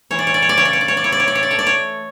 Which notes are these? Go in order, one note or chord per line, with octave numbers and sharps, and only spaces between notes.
E3 C#5
D5
C#5
D5
C#5
D5
C#3 C#5
D5
C#5
D5
C#5
D5
E4 C#5
D5
C#5
D5
C#5
D5
A3 C#5
D5
C#5